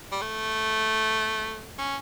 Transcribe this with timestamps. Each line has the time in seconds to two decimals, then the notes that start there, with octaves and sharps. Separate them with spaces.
0.12 G3
0.21 A3
1.78 C#4